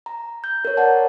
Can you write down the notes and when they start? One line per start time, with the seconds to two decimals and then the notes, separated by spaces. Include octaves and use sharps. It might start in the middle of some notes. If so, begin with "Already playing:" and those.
0.06 A#5
0.44 G6
0.65 A#4 C#5
0.77 A#4 D5 F#5 A5